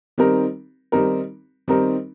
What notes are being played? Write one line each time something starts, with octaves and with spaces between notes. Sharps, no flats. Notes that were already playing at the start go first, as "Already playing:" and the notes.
D#3 G3 C4 D#4 A#4
D#3 G3 C4 D#4 A#4
D#3 G3 C4 D#4 A#4